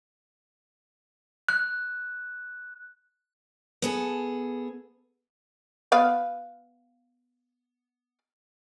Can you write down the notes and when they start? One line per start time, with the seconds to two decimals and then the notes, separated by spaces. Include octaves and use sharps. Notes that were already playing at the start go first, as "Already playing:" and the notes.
1.49 F#6
3.82 B3 G#4 A4
5.92 B3 B4 F5